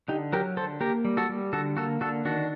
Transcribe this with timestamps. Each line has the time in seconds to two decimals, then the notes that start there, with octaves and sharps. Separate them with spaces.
0.08 D3 D#4 G4
0.33 F#3 G4 A#4
0.57 D3 A4 C5
0.81 A#3 G4 A#4
1.05 G3
1.17 F#4 A4
1.29 G3
1.53 D3 F#4 A4
1.77 A#3 F#4 A4
2.01 D3 F#4 A4
2.25 D#3 D4 F#4